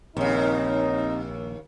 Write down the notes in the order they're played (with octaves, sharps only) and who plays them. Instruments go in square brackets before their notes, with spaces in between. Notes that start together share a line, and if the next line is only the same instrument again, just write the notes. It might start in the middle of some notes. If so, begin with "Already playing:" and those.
[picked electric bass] A#1 [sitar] D#2 C#3 [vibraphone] C4 [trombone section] D#4